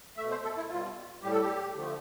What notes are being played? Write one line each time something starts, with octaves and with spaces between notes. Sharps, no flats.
B2 A3 E5
C5
A4
E4
B2 G3 F4
A2 G3 G4
A4
G4
D3 F3 A3